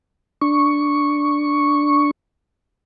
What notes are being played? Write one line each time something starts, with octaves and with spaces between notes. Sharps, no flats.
D4 C#6